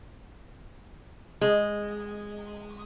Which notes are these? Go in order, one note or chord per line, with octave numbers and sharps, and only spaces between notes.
G#3